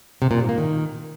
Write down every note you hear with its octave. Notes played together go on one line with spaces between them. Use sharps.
C3
A#2
G#2
A#3
D#3